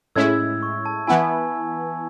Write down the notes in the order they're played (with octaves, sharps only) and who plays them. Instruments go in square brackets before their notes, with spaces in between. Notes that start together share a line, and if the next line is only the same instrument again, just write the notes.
[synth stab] A2 G#3 C#4 E4 [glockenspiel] E6 G#6
[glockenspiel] C#6
A5
[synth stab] E3 B3 E4 [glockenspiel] G#5